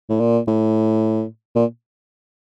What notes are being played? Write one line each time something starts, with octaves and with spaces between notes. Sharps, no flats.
A2
A#2
A2
A#2